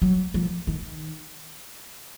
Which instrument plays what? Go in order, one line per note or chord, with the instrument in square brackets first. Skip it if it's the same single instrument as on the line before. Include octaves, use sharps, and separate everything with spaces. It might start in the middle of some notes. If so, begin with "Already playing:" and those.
[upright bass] F#3
F3
D#3